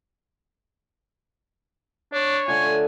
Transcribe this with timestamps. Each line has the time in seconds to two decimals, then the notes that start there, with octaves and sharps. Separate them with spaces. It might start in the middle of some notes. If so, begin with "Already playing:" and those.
2.13 D4 C#5
2.48 D3 A3 F4 G#5